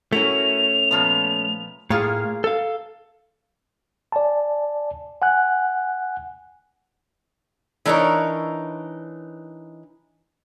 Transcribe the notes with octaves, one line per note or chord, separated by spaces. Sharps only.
A3 C#4 E4 F#4 A#4 F7
A#2 F3 B3
A2 A#3 F4 G#4 F5
A4 F5
D5 G#5 A5
F#5 G#5 F#6
E3 D4 D#4 A#4 C#5